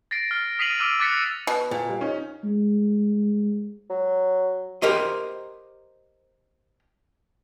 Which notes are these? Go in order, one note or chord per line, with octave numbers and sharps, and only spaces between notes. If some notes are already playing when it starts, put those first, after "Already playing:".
A6 A#6 C7 D7
F6
D#6 B6 C7 D#7 F7 F#7
D6 E6 F6 D7 D#7
D6 F#6 A6 B6 C#7
B2
A#2
G3
C#4 D#4
G#3
F#3
G4 A#4 C5 D#5